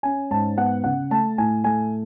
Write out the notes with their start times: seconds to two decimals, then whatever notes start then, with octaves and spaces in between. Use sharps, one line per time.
0.03 C#4 G#5
0.31 G#2 A5
0.57 B3 F#5
0.84 C#3 F#5
1.10 A3 A5
1.38 A2 G#5
1.64 A3 G#5